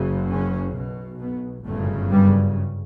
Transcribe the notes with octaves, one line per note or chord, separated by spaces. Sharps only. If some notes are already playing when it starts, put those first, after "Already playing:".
Already playing: F#1 F#2 C#3
C#3 C#4
B1 B2
B2 B3
G1 F#2 A2 C#3 A3
G2 G3